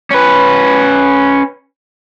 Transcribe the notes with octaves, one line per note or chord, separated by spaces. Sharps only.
C#4 B4